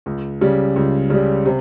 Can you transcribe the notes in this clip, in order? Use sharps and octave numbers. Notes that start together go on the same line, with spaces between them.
C#2
C#3 G3
C#2
C#3 G3
C3